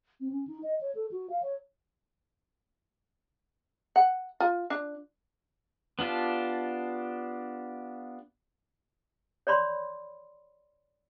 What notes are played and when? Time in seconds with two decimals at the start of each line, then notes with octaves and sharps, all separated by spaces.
0.20 C4
0.31 C#4
0.48 D#4
0.63 D#5
0.81 C#5
0.95 A4
1.11 F#4
1.30 F5
1.43 C#5
3.96 F#5
4.40 F4
4.70 D4
5.99 B3 D4 F4 G4 A5
9.47 C#5 D5 B5 C6